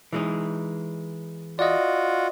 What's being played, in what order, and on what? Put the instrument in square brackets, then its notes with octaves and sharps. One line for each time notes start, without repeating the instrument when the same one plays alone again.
[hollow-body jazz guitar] E3 G#3 D#4
[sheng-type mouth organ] F4 F#4 [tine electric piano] D5 D#5